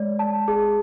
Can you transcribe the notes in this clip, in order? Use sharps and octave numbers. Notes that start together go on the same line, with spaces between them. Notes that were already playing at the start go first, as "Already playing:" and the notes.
Already playing: G#3 C#5 D5
A5
G#4